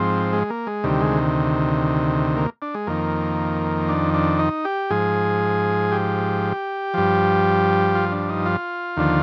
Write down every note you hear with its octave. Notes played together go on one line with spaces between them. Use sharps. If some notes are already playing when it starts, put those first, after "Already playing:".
Already playing: G#2 F3 C4
G#3
A#3
G#3
D2 C3 D#3 G3
G#3
A#3
D4
G#3
F2 D#3 A#3
D4
D4
D#4
G4
G#2 F3 G#4
G4
G2 F3
F4
D4
D#4
F4
D#2 D3 F3